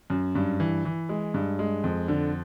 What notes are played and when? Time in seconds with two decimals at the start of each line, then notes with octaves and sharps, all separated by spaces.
0.10 F#2
0.35 G2
0.60 E3
0.85 E3
1.09 G#3
1.34 G2
1.59 G#3
1.84 F2
2.08 D3